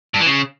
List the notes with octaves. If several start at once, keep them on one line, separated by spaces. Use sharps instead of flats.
G2
E3
C#3